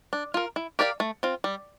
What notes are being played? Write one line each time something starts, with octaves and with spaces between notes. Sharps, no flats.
D4
F4 A#4
E4
G4 A#4 D5 F5
A3
C4 F4
G3